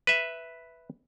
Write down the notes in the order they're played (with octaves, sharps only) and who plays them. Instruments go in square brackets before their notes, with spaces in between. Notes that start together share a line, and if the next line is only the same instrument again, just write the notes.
[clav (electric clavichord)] B4 E5